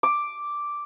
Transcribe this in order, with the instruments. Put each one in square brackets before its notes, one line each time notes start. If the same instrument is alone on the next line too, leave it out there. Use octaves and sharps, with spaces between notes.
[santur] D6